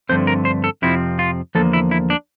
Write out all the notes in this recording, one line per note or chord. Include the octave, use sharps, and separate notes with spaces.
G2 D3 F3 A3 C4 C5
A#4
C5
A4
F2 C3 F3 C4 E4
F4
E2 D3 F3 A#3 A4
E4
E4
D4